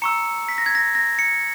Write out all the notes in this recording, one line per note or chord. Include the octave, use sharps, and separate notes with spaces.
A#5 C#6 E6 C#7
B6
A#6
G#6
A#6
A#6
C#7